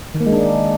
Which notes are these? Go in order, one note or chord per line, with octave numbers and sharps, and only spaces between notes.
D#3
A#3
G#3
D4